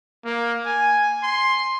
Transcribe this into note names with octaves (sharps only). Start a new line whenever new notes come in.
A#3
G#5
C6